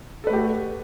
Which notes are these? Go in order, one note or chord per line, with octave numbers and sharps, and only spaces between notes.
A3 F#4 G4 A4 B4